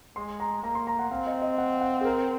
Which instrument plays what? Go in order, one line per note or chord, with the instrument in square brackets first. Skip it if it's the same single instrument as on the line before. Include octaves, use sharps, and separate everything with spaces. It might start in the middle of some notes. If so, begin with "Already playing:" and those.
[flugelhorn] G#3 [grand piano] C6
[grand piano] A#5
[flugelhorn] A#3 [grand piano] A#5
[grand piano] C6
A#5
F#5
[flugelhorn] C4 [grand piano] F5
[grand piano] D#5
D#5
F#5
F#5
G#4
A#4